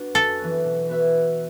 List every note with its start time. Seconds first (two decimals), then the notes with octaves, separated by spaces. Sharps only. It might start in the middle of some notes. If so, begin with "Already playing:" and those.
Already playing: B3 D4 F#4
0.15 F#2 A4
0.39 E3 B3 F#4
0.64 B2
0.89 B3 F#4 B4 E5